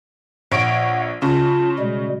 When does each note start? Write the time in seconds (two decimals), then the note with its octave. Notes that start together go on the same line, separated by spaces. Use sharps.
0.52 A#1 C#5 F#5 D7
1.22 C#3 F4 A5
1.79 B2 G3 G#3